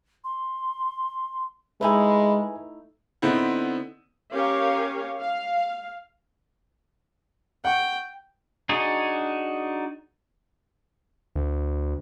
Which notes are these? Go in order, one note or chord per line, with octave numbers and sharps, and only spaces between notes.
C6
G#3 A3 D#4 E4 B4 G#5 B5
D3 B3 C4 D#4 E4
C#4 G4 A#4 C#5 F5
F5
F#5 G5 C#6
D4 D#4 F#4 G#4
D2